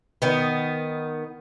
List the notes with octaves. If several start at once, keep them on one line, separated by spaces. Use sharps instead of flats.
D#3 B3